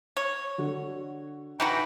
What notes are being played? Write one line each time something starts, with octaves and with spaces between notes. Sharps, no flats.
C#5
D3 F#4
E3 D#4 F#4 G5 A#5 B5 G6